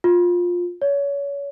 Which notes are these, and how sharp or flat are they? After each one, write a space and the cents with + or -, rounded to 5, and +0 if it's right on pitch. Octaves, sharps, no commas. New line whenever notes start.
F4 +15
C#5 +30